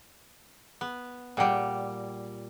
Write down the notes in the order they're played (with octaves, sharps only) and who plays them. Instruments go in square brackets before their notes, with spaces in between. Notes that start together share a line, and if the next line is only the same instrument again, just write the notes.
[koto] B3
[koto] A#2 G3 [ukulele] G#4 F#5 G5